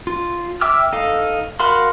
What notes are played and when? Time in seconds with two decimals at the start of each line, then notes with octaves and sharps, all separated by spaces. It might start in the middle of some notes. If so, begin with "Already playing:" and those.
0.07 F4
0.61 E5 G5 D6 E6 F6
0.93 D#4 A4 F5
1.60 F#4 A#4 F5 B5 C6